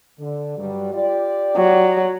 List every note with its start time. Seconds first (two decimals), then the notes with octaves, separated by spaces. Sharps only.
0.19 D3
0.58 G2 F#3 G3
0.94 F4 G4 D5
1.57 F#3